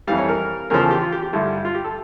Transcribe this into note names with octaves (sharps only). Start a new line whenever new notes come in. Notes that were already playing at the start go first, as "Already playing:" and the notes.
F2 E3 G3 F5
C#5
A#4
E2 C#3 F3 A#4
A4
G4
F4
G4
G4
G2 D3 G3 E4
F4
G4
A4